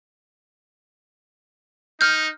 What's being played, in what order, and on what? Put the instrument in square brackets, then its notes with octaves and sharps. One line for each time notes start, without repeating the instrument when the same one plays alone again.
[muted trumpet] D#4 [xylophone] F6 G6